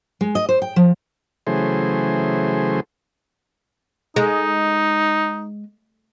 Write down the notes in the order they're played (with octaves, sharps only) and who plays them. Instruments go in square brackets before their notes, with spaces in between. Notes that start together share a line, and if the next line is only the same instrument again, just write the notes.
[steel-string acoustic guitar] G#3
D#5
C5
G5
F3
[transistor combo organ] C#3 E3 F#3 A3 G#4 C5
[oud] G#3 [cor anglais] D#4